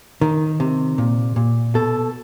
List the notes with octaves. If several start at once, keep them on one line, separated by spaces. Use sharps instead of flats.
D#3
C3
A#2
A#2
B2 A4